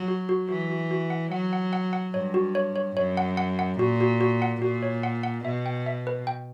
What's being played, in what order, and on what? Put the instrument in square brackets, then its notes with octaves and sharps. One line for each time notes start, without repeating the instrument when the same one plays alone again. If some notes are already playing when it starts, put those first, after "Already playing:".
Already playing: [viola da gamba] F#3
[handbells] F#4
F#4
[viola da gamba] E3 [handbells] F#4
[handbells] F#4
F#4
F#5
[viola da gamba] F#3 [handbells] F#5
[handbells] F#5
F#5
F#5
[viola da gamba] G2 [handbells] C#5
[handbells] F#4
C#5
C#5
[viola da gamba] F#2 [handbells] C#5
[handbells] F#5
F#5
F#5
[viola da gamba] A#2 [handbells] F#4
[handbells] F#4
F#4
F#5
[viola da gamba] A#2 [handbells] F#4
[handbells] C#5
F#5
F#5
[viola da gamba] B2 [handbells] E5
[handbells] G5
E5
B4
G5